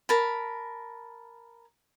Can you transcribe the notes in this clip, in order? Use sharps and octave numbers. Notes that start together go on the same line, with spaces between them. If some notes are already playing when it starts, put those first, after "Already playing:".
A#4 A5 B5